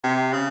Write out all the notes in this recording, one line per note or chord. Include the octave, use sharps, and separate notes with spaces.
C3
C#3